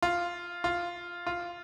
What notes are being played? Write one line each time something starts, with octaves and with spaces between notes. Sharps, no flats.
F4
F4
F4